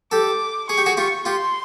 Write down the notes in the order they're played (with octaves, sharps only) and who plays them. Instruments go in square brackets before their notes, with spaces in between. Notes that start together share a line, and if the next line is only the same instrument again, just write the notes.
[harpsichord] G4 A4 [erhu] D6
[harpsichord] G#4 [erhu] C#6
[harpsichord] G4
F#4 G#4
[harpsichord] F4 G4 [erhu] C#6
[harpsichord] F4 G4 [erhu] C6